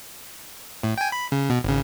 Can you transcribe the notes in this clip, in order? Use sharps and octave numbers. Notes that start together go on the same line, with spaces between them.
A2
G5 G#5
B5
C#3
B2
G#1 C#3